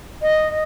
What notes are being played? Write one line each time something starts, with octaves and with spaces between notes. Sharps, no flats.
D#5